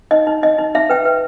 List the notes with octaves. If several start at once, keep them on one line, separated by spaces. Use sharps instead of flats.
D#4 D#5
D#4
D#4 D#5
D#4
D#4 E5
B4 G5
B4